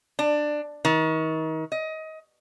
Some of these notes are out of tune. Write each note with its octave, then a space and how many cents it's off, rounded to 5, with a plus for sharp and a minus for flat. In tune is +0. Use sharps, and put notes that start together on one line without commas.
D4 +15
D#3 +35
D#5 +25